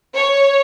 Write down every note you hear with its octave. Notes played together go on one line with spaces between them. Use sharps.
C#5